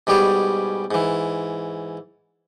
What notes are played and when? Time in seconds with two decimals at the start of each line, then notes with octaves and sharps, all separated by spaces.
0.07 G#2 B2 G3 G4 G#4
0.91 G#2 E3